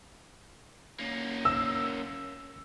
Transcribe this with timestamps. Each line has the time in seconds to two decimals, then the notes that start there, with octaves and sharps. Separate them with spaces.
0.99 A#3 C#4
1.45 E6